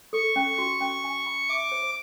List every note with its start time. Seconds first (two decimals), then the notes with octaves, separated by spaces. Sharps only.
0.13 A4 C#6
0.36 C#4
0.58 F#4
0.81 C#4
1.04 G#5
1.26 B5
1.49 E5 D6
1.72 C5